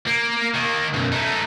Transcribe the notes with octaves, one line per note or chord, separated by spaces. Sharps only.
A#3
D#3 A#3
B1 F#2
A3 D#4